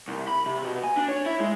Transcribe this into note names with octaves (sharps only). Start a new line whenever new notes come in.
C2
B5
C3
B2
G#5
D4
C#5
E4
G#3